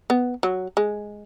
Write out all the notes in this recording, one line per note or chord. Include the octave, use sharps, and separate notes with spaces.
B3
F#3
G#3